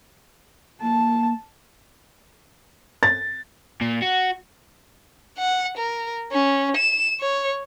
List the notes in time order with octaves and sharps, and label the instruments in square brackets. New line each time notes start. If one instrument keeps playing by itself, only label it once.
[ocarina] A#3 [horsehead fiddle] A5
[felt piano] A6
[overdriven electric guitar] A#2
F#4
[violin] F#5
A#4
C#4
E7
C#5